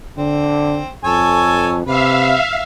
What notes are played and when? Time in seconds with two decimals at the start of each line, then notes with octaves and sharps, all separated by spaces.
0.18 D3 C4
1.04 F2 A4 C#5 G#5
1.87 C3 B4 E5 F5